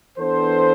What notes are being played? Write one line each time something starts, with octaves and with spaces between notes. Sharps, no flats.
E3 B3 D4 A4 C5